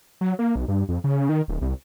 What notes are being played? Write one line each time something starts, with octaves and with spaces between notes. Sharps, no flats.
F#3
A#3
B1
G2
F2
C#3
D#3
D1
C2